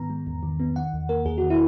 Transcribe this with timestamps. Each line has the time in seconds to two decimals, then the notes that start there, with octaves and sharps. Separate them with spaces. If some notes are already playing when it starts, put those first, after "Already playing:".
Already playing: G#2 D#3 B3 A#5
0.10 G#3
0.27 E2
0.43 D#3
0.60 B3
0.76 D#3 F#5
0.93 E2
1.09 A#3 A#4
1.25 E2 G#4
1.38 D#3 F#4
1.50 E4